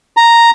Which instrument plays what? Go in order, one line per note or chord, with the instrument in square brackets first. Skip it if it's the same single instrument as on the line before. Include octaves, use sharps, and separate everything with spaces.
[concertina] A#5